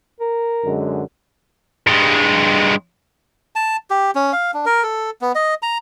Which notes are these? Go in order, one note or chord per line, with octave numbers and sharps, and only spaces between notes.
A#4
F#2 D3 G#3
G2 G#3
A5
G4
C#4
F5
D4
A#4
A4
B3
D#5
A#5